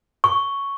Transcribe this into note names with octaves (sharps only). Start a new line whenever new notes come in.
C#6